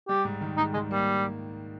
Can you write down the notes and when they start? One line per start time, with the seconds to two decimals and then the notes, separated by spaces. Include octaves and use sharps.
0.08 G3 G4
0.25 G#2
0.41 D#3
0.58 G#2 D#4
0.74 D#3 G#3
0.90 G3 A#3